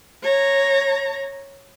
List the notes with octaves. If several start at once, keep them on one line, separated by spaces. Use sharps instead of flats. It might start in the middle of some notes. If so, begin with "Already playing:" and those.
C#5 A#5